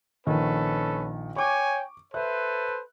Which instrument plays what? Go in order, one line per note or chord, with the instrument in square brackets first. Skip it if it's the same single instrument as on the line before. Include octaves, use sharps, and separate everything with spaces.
[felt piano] A#1 D#3 [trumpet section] C#4 A4 B4
[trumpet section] C#5 G5 G#5 [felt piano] C#6 D6
[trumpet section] A4 B4 C5 [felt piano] E5 F#6